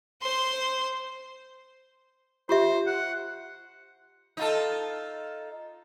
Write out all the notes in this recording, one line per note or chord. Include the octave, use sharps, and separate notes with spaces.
C5 C6
F4 G4 C5 E5
F#5
D#4 F4 A4